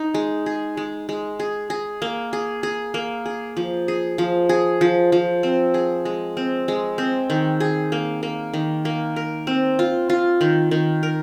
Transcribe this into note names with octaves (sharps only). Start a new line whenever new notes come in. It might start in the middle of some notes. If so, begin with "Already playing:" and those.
Already playing: D#4
G#3
G#4
G#3
G#3
G#4
G#4
A#3
G#4
G#4
A#3
G#4
F3
G#4
F3
G#4
F3
F3
C4
G#4
G#3
C4
G#3
C4
D#3
G#4
A#3
A#3
D#3
A#3
A#4
C4
F4
F4
D#3
D#3
A#4